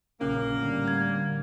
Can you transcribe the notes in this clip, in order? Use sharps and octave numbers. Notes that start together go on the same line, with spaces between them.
A#1 F#2 C#3 A#3 C#4
A2 D3 G3
G#6